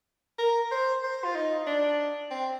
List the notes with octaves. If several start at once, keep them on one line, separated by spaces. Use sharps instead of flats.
A#4
C5
C5
F4
D#4
D4
C4